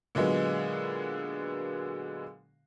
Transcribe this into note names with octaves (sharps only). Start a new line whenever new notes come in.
A#2 D3 F#3 G#3 B3